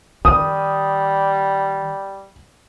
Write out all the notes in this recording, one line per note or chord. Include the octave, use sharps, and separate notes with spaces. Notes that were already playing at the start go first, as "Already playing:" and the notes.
D#3 G3 D#6